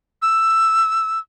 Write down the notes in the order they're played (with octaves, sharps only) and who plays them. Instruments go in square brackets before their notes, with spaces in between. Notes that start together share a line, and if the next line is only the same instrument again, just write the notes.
[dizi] E6